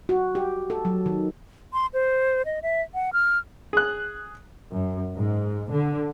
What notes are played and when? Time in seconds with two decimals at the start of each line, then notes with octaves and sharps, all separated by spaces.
0.09 F#4
0.35 G4
0.70 A4
0.85 F#3
1.06 D#3
1.73 C6
1.93 C5
2.46 D#5
2.62 E5
2.94 F#5
3.13 F6
3.73 G#4 F#6
4.72 F#2
5.16 G#2
5.72 D3